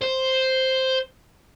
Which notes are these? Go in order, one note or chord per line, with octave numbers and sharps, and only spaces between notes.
C5